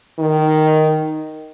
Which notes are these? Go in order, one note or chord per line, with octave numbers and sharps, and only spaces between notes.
D#3